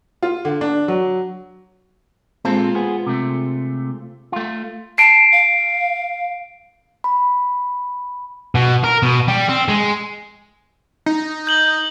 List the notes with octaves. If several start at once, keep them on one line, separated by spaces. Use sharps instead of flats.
F4
D3
D4
F#3
A#2 G#3 C4 F4 A4 C5
B3 G#4
C3 A3
A3 F4
A5 C7 D7
F5
B5
B2
A#4
B2
G3
C4
G#3
D#4
G6 F#7 G7